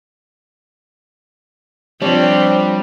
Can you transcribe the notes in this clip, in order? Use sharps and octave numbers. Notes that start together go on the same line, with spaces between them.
F3 G3 C4 D4 C#5